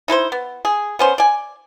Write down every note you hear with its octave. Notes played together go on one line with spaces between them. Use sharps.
D#4 E4 B4 C5
B3
G#4
B3 C#4 C5
D5 G#5